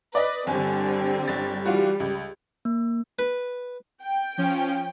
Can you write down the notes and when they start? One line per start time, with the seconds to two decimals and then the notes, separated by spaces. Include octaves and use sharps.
0.15 B4 D5 D#5
0.47 G1 D3 G3 C4 G#5
1.28 G1 A6
1.66 E3 G3 F4 F#4
2.00 C#2
2.65 A#3
3.19 B4
4.04 G5
4.38 F3 C#4